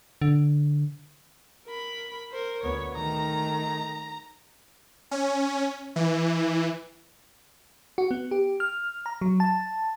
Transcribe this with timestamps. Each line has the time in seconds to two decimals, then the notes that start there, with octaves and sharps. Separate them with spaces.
0.22 D3
1.66 A#4 B5
2.32 A#4 C5
2.63 D2 B3 C#5
2.95 D#3 A3 A#5
5.11 C#4
5.96 E3
7.98 F#4
8.11 B3
8.31 G4
8.60 F6
9.06 A#5
9.21 F#3
9.40 A5